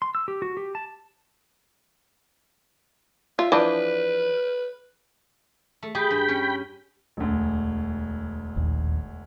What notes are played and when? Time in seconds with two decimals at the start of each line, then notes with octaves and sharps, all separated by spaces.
0.02 C6
0.15 E6
0.28 G4
0.42 F#4
0.57 G4
0.75 A5
3.39 F4 E5
3.52 E3 F3 D4 B4
5.83 A3
5.95 G4 G#4 G5 G#5 B5
6.11 G2
6.28 C#4
7.17 E1 D2
8.56 D#1 A#1 D#2